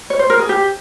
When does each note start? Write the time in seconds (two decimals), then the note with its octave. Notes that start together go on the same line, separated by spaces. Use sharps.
0.10 C#5
0.19 C5
0.30 A#4
0.39 G#4
0.49 G4